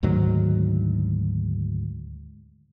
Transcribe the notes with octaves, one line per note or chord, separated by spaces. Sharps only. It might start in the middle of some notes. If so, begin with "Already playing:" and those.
D2 G#2 D#3 F#3